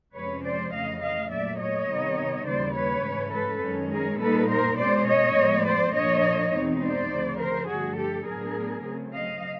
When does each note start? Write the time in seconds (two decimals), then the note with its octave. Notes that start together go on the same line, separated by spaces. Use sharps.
0.15 F2 C3 F3 G#3 C#4 B4 C#5
0.44 C5 D5
0.73 F2 C#3 E3 A3 C#4 D#5 F5
1.02 D#5 F5
1.31 A#2 F#3 A3 D5 E5
1.60 C#5 D#5
1.89 C3 D#3 G3 B3 D#4
2.47 D#2 C#3 E3 G3 C5 D5
2.76 B4 C#5
3.05 G#2 E3 A3 C#4
3.34 A4 B4
3.63 F#2 D#3 G#3 C#4
3.92 G#4 A#4
4.21 A#2 G3 A#3 D#4 A4 B4
4.50 A#4 C5
4.79 B2 G#3 C#4 C5 D5
5.08 C#5 D#5
5.37 A2 F3 G#3 B3
5.66 C5 D5
5.95 A#2 F3 A#3 D4 C#5 D#5
6.54 E2 B2 G#3 C4 D#4
6.82 C5 D5
7.12 D2 C#3 F3
7.40 A#4 C5
7.69 G2 D3 F3 A3 F#4 G#4
7.98 G4 A4
8.27 A2 F#3 B3 D4 G#4 A#4
8.85 C#3 F#3 A3 C4
9.14 D#5 F5